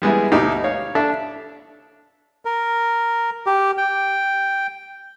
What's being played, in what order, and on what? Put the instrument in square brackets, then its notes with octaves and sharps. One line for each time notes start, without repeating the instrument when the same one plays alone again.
[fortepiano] G3 G#3 B3 E4
D2 B2 D#4 E4 G4
C#5 F5
D4 A4 E5
[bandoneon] A#4
G4
G5